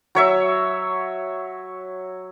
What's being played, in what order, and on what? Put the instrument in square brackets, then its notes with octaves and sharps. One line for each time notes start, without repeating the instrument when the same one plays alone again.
[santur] F#3 C#5 E5